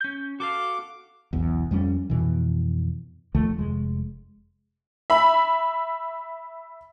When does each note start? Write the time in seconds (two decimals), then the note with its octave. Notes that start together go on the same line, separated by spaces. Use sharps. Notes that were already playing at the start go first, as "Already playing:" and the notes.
0.01 C#4 G6
0.40 F#4 A4 F5 D6
1.33 E1 B1 E2
1.71 F2 G3 A#3 C#4
2.10 F2 B2 E3
3.35 D#2 D#3 F3 A3
3.58 F1 G#3
5.10 E5 B5